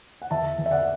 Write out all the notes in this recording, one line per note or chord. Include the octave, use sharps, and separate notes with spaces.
F#5
E2 E5 A5
E2
E5
D5 F#5